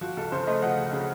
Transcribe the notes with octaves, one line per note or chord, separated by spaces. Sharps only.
F3 F#4
C#2 A4
C#3 A4 C5
A3 C5 D#5
F3 D#5 F#5
C#2
C#3